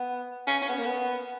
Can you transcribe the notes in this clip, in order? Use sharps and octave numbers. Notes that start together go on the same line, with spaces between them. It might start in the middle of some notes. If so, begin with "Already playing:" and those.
Already playing: B3
C#4
C#4
B3
A#3
B3